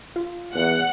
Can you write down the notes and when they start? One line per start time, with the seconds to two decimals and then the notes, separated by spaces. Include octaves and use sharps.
0.16 F4
0.55 E2 F#5